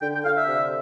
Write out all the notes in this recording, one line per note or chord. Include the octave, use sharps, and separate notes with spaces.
D3 G5
G5
D3 F5
E5
C3